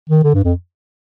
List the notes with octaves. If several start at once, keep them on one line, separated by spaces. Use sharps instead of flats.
D#3
D3
G2
F2